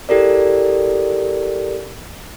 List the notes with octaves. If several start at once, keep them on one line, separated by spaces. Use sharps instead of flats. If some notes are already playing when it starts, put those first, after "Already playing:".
E4 G4 A4 A#4 D5